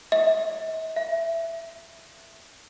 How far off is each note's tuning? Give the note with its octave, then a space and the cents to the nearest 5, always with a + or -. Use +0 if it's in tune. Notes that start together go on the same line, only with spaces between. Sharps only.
E5 -45
E5 +10